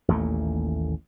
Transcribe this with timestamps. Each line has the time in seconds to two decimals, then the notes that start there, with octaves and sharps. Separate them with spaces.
0.08 A1 D#2 A#2 A3